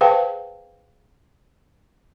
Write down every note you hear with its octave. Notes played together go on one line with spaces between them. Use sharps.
G#4 B4 C5 F5 G5 A5